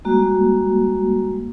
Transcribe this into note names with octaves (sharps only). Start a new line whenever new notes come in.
G3 G#3 A#3 F#4